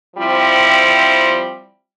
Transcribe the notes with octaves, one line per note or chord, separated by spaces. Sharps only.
F3 G3 C4 E4